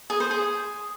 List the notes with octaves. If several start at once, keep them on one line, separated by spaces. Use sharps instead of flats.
G#4
C5
G#4